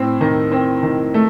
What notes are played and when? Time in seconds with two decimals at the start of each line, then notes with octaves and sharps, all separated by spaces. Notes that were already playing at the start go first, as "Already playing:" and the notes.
Already playing: A2 C4
0.21 D#3
0.51 C4
0.83 D#3
1.14 A3